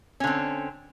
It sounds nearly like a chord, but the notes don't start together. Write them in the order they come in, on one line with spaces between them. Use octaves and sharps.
C#4 D3 C4